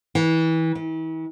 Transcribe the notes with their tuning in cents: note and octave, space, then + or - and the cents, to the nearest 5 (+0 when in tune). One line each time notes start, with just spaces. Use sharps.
E3 -25
E3 -40